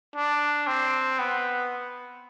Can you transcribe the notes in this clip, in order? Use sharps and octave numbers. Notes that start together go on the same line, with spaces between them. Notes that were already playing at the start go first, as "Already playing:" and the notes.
D4
C4
B3